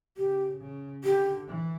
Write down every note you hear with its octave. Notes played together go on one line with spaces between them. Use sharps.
C#3 G4
C#3
D3 G4
E3